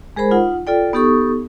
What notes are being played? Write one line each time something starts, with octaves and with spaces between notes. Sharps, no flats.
G#3 G#4 A#4 C5 B5
D#4 F4 F#5
F4 A4 D5 G5
B3 D#4 G4 A4 C#6 D#6